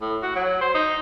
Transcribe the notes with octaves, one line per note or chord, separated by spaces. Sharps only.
A2
F#4
F#3
C5
D#4